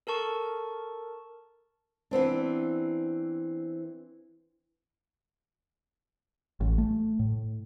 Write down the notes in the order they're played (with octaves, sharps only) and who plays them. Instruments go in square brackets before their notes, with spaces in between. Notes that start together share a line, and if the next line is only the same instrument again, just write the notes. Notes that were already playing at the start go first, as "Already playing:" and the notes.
[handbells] A4 A#4 A5 C#6
[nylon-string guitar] E3 B3 C4 D4
[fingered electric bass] A1
A3
A2